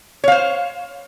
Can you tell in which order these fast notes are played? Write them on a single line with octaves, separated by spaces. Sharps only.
C#5 F5 C5